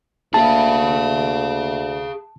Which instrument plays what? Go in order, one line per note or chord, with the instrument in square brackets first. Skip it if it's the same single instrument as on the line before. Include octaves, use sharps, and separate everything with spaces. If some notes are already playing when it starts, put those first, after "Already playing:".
[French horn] D2 [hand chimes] A#3 E5 B5 [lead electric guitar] G#4 F5 [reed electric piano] A5